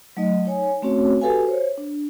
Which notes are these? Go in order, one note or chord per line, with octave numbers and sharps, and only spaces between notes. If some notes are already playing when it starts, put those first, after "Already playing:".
F#3 A3 D#4 D#5
D#4 C#5 G#5
A3 C4 C#4 F#4 C#5
F#4 G4 A4 B4 F5 G#5
C5 C#5
D4